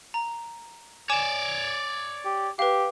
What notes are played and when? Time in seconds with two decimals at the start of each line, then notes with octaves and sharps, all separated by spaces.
0.14 A#5
1.10 C#5 D5 G#5 D6 E7
2.25 G4
2.59 G4 B4 F5